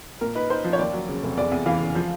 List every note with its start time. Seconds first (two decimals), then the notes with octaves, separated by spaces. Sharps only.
0.21 A#2 A#4
0.35 D#4 B4
0.50 D#4 C5
0.64 F3
0.73 C#5
0.79 D#2 D5
0.93 F#3
1.09 C#3
1.23 F1
1.37 E2 D5
1.51 E2
1.66 E3 F5
1.81 C#3
1.95 F3